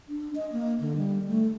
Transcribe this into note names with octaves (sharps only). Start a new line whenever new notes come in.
D4
D#5
A#3
D3
G3
A3